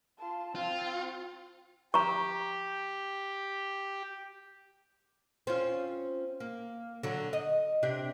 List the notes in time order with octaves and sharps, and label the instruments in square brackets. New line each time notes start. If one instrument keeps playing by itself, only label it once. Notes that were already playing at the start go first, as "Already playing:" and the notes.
[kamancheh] F4 A5
[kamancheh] C4 [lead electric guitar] F4
[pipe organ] G4 [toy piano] A#5 C#6
[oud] C4 C#4 F4
A#3
D3 F#3
D#5
C3 D4 G4